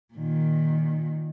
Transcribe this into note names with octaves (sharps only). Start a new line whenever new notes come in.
A#2 D#3